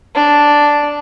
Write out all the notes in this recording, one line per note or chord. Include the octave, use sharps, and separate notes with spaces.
D4